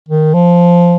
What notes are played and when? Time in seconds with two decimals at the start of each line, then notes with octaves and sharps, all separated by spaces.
0.09 D#3
0.34 F3